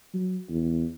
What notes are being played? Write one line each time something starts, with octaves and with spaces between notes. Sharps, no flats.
F#3
E2